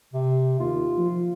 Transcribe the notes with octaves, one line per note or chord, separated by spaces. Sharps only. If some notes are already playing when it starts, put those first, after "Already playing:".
C3
D#2 F4
F3